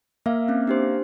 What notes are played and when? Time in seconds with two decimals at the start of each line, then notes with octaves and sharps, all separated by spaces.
0.26 A#3 E5 F5
0.48 C4 C#4 E5
0.67 D4 G4 C5